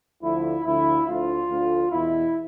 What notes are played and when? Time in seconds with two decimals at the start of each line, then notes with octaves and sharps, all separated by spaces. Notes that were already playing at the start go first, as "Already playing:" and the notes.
0.23 D2 D3 F3 E4
0.64 D2 D3 F3 E4
1.07 D2 D3 F3 F4
1.50 D2 D3 F3
1.91 E2 B2 E4